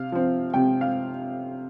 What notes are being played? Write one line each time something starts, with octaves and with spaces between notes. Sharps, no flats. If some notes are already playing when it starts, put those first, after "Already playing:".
Already playing: C3 F5
F3 C4
C3 G5
F5